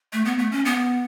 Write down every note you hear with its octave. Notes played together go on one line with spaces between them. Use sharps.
A3
B3
A3
C#4
B3